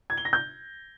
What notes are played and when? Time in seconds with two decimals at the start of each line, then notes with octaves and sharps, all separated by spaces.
0.10 G#6
0.17 G7
0.25 A#6
0.33 G6